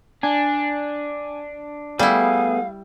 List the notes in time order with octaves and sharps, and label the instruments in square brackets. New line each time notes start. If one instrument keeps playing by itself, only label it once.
[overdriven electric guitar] D4 [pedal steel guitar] G#5
[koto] G3 E4 [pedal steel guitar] A3 B3 G#4 [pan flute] F5